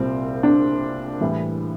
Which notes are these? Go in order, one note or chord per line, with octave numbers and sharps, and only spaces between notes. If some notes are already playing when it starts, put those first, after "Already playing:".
Already playing: C2 A#2 G3 C4
D4
A2 E3 G3